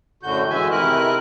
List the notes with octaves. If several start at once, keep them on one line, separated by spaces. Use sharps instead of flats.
F#2 A2 D3 F#4 G6
E3 G#3 E5 G#5
C3 D#3 E4 A#4 F#6